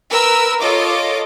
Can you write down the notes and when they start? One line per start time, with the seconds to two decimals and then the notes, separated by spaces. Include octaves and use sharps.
0.11 A#4 B4 E6
0.60 F4 A4 C#5 D#5 D6